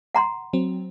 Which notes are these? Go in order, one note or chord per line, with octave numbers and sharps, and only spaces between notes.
F#5 A#5 C6
F#3 C4